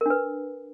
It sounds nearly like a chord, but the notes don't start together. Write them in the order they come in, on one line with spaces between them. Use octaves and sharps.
A#4 D4 B4